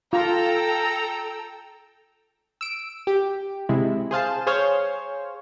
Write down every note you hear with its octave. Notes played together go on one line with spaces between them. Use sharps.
F4 A4 G5 A#5 E6
E6 D7
G4
C3 G#3 E4
G#4 C5 F5 A5
G#4 C5 C#5 F5